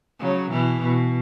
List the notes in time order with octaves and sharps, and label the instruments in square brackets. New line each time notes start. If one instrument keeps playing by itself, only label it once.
[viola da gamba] C#3 F#3
B2 E3
B2